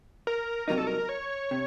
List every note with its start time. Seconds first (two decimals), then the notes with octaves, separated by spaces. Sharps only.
0.27 A#4
0.68 C2 C3 F#3 A#3 D#4 A#4
0.78 A4
0.87 A#4
1.09 C#5
1.51 C3